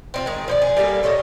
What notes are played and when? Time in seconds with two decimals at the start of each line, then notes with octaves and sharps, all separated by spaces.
0.14 C4 D#4 F4
0.26 D#3 G#3
0.48 F3 C5 D5
0.62 G#4
0.77 G3 A#3 A4 F5
1.03 A#2 A4 C#5 D#5